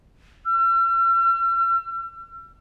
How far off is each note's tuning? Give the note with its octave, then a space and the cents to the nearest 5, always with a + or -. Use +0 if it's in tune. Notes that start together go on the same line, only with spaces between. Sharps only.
E6 +45